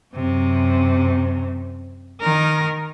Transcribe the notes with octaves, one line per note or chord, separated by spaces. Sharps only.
F#2 C3
D#3 A#4